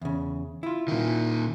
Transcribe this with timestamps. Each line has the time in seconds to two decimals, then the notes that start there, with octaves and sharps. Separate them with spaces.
0.02 E2 C#3
0.63 E4 F4
0.88 A#2 D#3